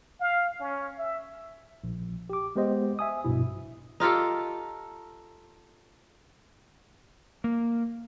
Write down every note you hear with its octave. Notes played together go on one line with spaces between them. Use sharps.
F5
C#4
E5
A#1
G4 D6
G#3 B3 G4 C5 D#5
E5 G#5 D#6
A#1 G2 B2 E4
D#4 F4 G4 A4
A#3